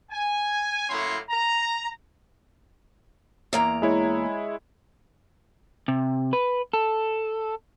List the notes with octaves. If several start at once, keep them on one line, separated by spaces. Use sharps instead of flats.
G#5
A2 F#3 A#3 C#4 E4 C6
A#5
E2 A#3 A#5
G#3 E4 C#5
C3
B4
A4